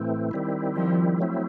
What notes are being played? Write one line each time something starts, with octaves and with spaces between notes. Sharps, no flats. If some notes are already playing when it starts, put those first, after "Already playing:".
Already playing: A2 E3 A3 C4
D#3 G3 C4 E4
F3
F#3 A3 C4 E4